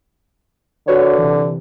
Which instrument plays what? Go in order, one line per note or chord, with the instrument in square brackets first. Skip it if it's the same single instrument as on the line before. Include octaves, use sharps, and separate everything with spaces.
[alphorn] D3 [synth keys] F#4 B4 C#5
[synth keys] C3 E3